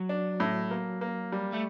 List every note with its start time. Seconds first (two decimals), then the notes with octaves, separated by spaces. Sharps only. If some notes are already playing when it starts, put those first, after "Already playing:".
Already playing: F#3
0.09 D4
0.40 A2
0.71 A#3
1.01 A#3
1.32 G3
1.54 A3